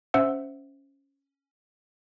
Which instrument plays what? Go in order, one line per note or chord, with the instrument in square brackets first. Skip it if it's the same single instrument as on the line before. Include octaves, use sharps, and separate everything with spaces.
[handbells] C#4 C5 E5 F#5 E6